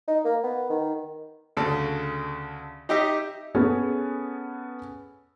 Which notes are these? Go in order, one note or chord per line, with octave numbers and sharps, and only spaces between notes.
D#4
A#3
B3
D#3
D2 C#3 A4
D#4 G4 D#5 E5
B3 C#4 G#4 A4